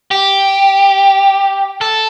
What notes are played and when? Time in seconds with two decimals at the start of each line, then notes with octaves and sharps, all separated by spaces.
0.11 G4
1.81 A4